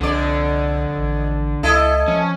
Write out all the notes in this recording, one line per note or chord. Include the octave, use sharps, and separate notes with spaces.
C2 F2 D3 D5
A1
C#2 E4 A4 D#5
F3 C#4